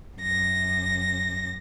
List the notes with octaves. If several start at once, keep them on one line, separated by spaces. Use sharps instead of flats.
F#2 A#6